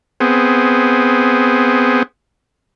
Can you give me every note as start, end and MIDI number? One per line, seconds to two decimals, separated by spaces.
0.20 2.03 59
0.20 2.03 60
0.20 2.03 68